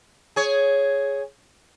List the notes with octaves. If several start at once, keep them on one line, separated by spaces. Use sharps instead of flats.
G#4 C#5